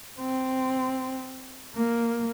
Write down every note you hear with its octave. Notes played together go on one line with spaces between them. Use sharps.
C4
A#3